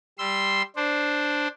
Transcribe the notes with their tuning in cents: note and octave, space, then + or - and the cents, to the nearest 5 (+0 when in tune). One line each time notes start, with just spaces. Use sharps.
G3 +0 C6 +0 E6 +0
D4 +0 C5 +0